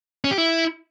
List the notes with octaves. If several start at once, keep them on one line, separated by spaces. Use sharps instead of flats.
C#4
G4
E4